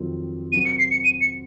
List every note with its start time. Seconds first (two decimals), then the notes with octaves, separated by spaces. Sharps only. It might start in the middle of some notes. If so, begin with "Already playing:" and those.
Already playing: F2 D#3 F#3 C4
0.52 C3 F#3 C4 F#4 A#4 D#7
0.65 C#7
0.79 C7
0.91 C#7
1.04 D#7
1.21 C#7